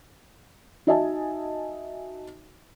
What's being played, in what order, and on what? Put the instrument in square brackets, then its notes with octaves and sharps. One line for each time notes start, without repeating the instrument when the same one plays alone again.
[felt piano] D#4 F#4 D#5 E5 G#5 A5